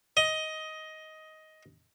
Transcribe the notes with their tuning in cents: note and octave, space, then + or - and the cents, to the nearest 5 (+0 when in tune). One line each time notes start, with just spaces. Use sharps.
D#5 +15